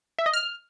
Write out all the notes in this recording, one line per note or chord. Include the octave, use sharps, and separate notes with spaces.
E5
D#5
F6